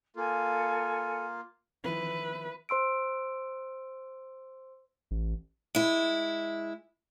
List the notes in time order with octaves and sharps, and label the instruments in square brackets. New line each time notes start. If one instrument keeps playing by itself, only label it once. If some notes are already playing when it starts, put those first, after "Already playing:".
[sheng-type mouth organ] A#3 F4 [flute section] A4 G#5
[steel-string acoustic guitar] D#3 F3 E4 [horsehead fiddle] B4
[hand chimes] C5 C6 E6 D7
[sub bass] A1
[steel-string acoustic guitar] G#3 E4